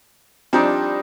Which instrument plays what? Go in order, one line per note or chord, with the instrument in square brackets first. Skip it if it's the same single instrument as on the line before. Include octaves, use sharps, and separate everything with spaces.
[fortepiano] F3 C4 D4 [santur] G3 D#4